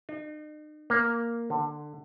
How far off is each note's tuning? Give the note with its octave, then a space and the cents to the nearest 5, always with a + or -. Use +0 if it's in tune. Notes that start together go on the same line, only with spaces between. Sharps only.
D#4 -40
A#3 +0
D3 +20